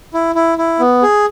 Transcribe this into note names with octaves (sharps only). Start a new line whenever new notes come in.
E4
E4
E4
B3
G#4